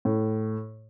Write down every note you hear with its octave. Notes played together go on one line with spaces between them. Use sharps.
A2